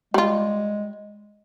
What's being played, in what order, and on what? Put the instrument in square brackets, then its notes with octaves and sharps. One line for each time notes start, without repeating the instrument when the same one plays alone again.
[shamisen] G3 F4 [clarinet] G#3